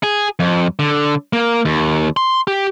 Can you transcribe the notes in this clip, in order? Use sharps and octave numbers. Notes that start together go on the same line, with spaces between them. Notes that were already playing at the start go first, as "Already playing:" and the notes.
G#4
F2
D3
A#3
D#2
C6
G4